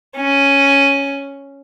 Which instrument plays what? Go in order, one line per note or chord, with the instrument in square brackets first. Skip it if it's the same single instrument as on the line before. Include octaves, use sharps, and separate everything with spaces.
[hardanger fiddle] C#4